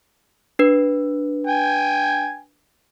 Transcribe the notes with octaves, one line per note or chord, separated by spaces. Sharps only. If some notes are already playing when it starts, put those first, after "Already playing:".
D4 B4
G5 G#5